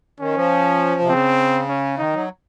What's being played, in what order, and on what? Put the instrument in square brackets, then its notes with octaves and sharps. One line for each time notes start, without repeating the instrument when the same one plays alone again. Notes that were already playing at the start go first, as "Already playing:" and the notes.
[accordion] D#3 [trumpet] C#4
[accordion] F3
C3
[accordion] C#3 [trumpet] C4
[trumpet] C#4
[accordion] D#3 [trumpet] D#4
[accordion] F#3